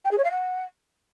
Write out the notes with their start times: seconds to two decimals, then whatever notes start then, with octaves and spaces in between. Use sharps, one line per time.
0.04 G5
0.11 G#4
0.17 C#5
0.24 F5
0.31 F#5